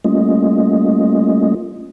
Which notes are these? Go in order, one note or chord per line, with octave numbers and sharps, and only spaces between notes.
G3 A3 A#3 C#4 F4 D#5